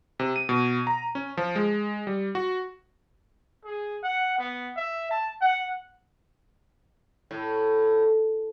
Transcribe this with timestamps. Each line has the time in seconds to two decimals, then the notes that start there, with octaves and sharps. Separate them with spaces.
0.19 C3
0.36 D#7
0.49 B2
0.87 A#5
1.15 C#4
1.37 F3
1.56 G#3
2.07 G3
2.35 F#4
3.64 G#4
4.03 F#5
4.39 B3
4.77 E5
5.11 A5
5.42 F#5
7.31 A2